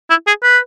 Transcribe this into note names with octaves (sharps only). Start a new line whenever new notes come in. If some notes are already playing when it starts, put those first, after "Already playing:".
E4
G#4
B4